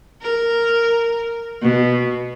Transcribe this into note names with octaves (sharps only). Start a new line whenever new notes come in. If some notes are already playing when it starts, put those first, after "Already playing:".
A#4
B2